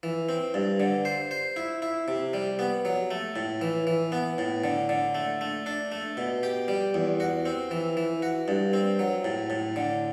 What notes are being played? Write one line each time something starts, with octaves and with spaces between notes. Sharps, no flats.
E3
C4
G2
D3
C5
C5
E4
E4
C3
G3
B3
F#3
A3
A2
E3
E3
B3
A2
D3
D3
A3
A3
D4
A3
B2
G4
G3
E2
F#4
C4
E3
E3
F#4
G2
C4
F#3
A2
A2
D3